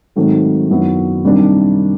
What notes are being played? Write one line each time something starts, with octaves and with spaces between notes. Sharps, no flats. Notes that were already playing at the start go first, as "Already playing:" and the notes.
G#2 D#3 F#3 A3 C4
F#2 D#3 F#3 B3 E4
C3 D#3 G3 A#3 D4